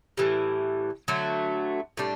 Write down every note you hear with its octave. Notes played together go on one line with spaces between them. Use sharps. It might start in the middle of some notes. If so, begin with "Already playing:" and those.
A2 E3 G3
D3 F#3 A3
A2 G3 D4